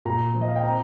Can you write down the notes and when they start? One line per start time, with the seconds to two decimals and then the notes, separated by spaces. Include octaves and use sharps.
0.05 A#2 A#5
0.35 F3
0.41 D#5
0.48 F5
0.56 G5
0.64 C4 A#5